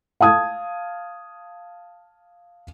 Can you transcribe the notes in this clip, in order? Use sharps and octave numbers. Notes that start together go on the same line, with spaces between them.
F5 A5 D#6 G#6